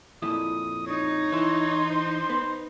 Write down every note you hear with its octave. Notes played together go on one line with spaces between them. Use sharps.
F2 A#2 E4 D#6
D#4 C#5
E3 E4 C6
C5
B3